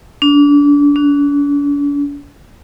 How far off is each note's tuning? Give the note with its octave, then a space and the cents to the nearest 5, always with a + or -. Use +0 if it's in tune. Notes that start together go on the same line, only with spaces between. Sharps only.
D4 -30
D4 -45